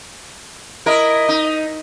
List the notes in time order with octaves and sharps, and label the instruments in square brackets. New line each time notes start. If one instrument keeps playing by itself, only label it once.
[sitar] E4 A#4 [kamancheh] D#5
[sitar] D#4